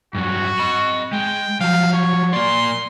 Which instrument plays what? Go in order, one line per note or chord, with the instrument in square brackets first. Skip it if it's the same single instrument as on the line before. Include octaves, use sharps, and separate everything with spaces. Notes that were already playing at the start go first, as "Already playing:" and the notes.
[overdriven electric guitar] G2 F#3 [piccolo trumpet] F#4
[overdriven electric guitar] D#5 B5
[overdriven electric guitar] G#3 [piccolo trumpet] G5
[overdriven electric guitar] F3 F#3 [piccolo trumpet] F5
[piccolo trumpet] C#5
[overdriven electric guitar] A#3 D5 [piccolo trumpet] C6